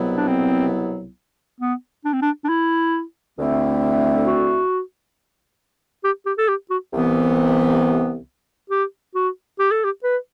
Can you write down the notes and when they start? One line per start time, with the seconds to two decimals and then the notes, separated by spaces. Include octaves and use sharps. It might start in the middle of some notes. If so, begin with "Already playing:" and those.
Already playing: C2 B2 F#3 B3 E4
0.16 D4
0.27 C4
1.60 B3
2.05 D4
2.13 C4
2.22 D4
2.44 D4
2.49 E4
3.37 D2 D3 A3 C4 E4
4.27 F#4
6.04 G4
6.26 G4
6.38 A4
6.48 G4
6.70 F#4
6.93 C2 C3 E3 B3
8.70 G4
9.15 F#4
9.59 G4
9.71 A4
9.84 G4
10.03 B4